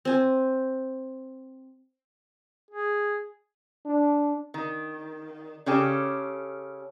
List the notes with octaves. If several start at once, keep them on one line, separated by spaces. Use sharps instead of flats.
C4 G#5
G#4
D4
D#3
C#3 C#4 G4 A4